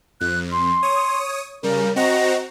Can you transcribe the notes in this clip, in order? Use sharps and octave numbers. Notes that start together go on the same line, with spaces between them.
F2 F#6
C6
C#5 D#6
C#3 G3 A#4
C4 F#4 D#5 A#5